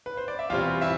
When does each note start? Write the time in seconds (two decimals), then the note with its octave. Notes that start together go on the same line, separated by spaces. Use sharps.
0.06 B4
0.17 C5
0.28 D5
0.39 E5
0.50 E2 B2 G3 C4 F4 F5
0.81 E4 E5